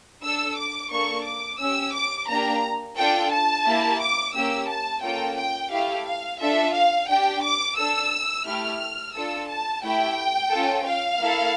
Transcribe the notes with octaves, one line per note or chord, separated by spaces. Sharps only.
D4 A4 E6
D6
A#3 D4 A4 C#6
D6
C#4 G4 E6
D6
A#3 D4 G4 A#5
D4 F4 A4 G5
A5
A#3 E4 G4
D6
A#3 C#4 G4 E6
A5
A#3 C#4 F4 A4 G5
G5
A3 E4 G4 F5
F5
D4 F4 A4 E5
F5
D4 G4 G5
D6
D4 A4 E6
A3 E4 G4 F6
D4 F4 A4 E6
A5
A3 E4 G4 G5
C#4 F4 A4
F5
A#3 E4 A4